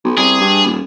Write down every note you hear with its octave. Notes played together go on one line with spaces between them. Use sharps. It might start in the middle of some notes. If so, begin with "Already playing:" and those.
B1
C2 G#4
G2
D#1